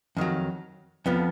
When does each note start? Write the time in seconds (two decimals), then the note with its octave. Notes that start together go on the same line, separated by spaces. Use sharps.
0.17 F2 D#3 F#3
1.06 F2 F3 B3